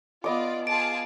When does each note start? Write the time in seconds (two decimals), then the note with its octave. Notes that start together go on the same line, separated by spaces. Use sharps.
0.24 B3 F4 D5 D#5 D6
0.67 F4 G#4 A5 D7